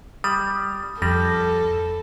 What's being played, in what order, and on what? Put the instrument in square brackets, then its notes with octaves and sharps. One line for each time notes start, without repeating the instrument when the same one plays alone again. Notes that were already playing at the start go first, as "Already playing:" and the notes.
[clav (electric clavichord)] G3 [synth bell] D#6
[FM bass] F2 [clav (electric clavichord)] G3 [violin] A4 [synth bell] A#6